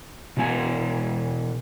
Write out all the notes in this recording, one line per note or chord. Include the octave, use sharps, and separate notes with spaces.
B2 E3 B3 G#5